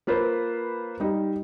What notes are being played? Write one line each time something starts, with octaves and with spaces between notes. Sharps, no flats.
A#3 F4 B4 C5
G3 D#4